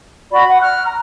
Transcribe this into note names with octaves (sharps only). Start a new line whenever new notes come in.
F#4 D5 B5
F#5
F6 F#6
A#5